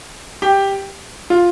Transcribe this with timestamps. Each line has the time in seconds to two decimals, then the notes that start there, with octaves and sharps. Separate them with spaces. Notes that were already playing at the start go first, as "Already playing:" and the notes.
0.42 G4
1.30 F4